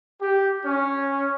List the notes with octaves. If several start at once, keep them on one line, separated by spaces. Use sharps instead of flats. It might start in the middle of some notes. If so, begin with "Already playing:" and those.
G4
C#4